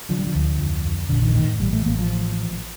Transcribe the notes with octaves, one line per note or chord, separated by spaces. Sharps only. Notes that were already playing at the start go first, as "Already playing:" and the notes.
D3 F3
G3
F3
D2
F2
F2
A#1 D3
D#3
A2 D#3
A1 G3
A3
A1 A#3
F3